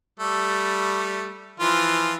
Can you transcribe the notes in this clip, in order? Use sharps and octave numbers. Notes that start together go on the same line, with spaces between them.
G3 A3
E3 F3 F4